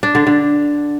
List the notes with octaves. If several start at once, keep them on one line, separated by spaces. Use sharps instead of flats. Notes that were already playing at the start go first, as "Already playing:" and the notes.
D4
D3
D3